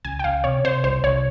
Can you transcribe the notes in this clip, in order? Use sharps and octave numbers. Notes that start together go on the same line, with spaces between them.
C#2 G#5
G5
C#2 F5
C3 C#5
C3 C5
C2 C5
C2 C#5